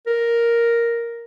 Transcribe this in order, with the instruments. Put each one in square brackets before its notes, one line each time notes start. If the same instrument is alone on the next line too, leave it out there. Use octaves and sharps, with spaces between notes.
[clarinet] A#4